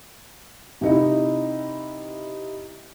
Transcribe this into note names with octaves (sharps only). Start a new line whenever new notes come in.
C3 D#4 E4